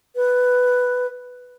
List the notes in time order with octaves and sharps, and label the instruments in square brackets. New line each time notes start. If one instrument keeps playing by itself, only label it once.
[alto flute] B4